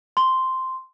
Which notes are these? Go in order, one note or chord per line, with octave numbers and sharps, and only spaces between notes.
C6